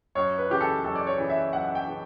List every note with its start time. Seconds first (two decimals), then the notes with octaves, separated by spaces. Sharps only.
0.15 F#2 C#5
0.38 B4
0.49 C#3 E3 G4
0.61 A4
0.84 F#2 A4
0.96 D5
1.07 C#5
1.18 C#3 E3
1.30 E5
1.52 F#2 F#5
1.65 F#5
1.75 G5
1.87 C#3 E3